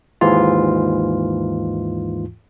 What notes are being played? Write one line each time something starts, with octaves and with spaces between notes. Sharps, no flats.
D#2 G#2 E3 F4